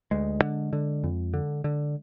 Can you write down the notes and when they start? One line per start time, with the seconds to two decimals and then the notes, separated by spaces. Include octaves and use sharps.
0.11 D2 G#3
0.42 D3
0.73 D3
1.04 F2
1.34 D3
1.64 D3